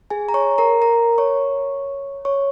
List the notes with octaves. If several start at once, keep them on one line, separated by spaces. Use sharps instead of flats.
G#4 G#5
A#5
C#5 C#6
A#4 A#5
A#4 A#5
C#5 C#6
C#5 C#6